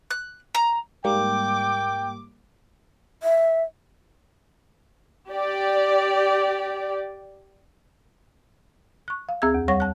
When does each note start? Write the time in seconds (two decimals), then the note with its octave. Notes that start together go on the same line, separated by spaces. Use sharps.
0.11 F#6
0.55 A#5
1.05 G#2 G3 A#3 G5 D6
3.23 E5
5.30 G4 D5
9.08 C#6 F#6
9.29 F5
9.42 D2 C4 G#4 E6 G#6
9.54 E2
9.68 G3 C#5 F#5 C#6 A#6
9.80 A5 F#6